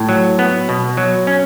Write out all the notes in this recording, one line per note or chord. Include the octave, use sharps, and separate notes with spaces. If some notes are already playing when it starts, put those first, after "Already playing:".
Already playing: A2
F#3
B3
B2
F#3
C#4